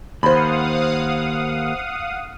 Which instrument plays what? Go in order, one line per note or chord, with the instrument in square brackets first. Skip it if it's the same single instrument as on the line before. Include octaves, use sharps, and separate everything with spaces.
[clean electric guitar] D#2 [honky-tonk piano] C5 B5 [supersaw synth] F5 F#5 D#6